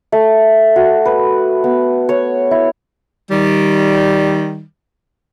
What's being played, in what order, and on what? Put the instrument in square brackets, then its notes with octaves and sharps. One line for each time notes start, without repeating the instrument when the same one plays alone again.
[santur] A3
F#4
B4
B3
C#5
E4
[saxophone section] D#3 G3